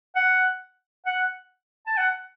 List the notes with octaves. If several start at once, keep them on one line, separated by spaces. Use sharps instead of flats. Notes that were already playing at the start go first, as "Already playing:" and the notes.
F#5
F#5
A5
F#5